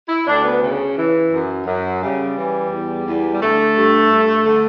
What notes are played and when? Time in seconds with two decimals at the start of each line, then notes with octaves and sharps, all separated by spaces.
0.09 E4
0.26 D2 D4
0.44 B3
0.62 C#3
0.97 E3
1.32 F#2
1.66 F#2
2.01 C#3 G3
2.35 E3
2.70 E2
3.05 E2
3.33 G3
3.40 D3 A3
3.76 G2
4.10 G2
4.45 D3